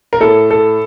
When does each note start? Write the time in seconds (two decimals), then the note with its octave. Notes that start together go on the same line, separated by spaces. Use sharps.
0.13 A#4
0.20 A2 A4
0.51 A4